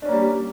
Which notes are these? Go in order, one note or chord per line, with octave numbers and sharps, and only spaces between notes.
G3 A#3 C#4 D4